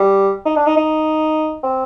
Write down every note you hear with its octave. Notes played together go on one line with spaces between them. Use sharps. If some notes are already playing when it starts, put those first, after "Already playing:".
Already playing: G3
D#4
D4
D#4
D#4
C4